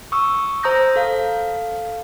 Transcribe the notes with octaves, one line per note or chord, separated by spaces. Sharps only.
C#6 D#6 E6
C5 A#5 D#6 G6 A#6
A4 F5